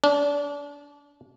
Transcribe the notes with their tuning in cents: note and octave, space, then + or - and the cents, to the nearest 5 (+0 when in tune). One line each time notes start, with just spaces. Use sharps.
D4 -30